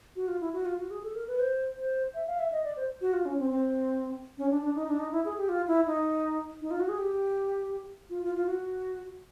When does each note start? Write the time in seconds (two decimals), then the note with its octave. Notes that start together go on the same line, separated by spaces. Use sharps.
0.16 F#4
0.28 F4
0.41 E4
0.53 F#4
0.65 F4
0.79 F#4
0.90 G#4
1.03 A4
1.15 A#4
1.27 B4
1.39 C5
1.77 C5
2.14 E5
2.27 F5
2.39 E5
2.52 D#5
2.64 D5
2.77 C5
3.01 F#4
3.13 F4
3.26 C#4
3.39 C4
3.50 C4
4.38 C#4
4.51 D4
4.62 D4
4.75 D#4
4.88 D4
4.99 D#4
5.12 E4
5.25 G#4
5.37 G4
5.49 F4
5.68 E4
5.86 D#4
6.62 D#4
6.71 F4
6.80 F#4
6.89 G#4
6.98 G4
8.10 F4
8.23 F4
8.35 F4
8.46 F#4